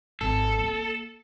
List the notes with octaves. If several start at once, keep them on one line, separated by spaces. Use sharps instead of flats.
G#1 A4
A#3